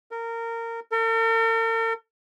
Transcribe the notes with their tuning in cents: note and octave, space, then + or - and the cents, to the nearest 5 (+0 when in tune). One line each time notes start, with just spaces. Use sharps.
A#4 -20
A#4 -45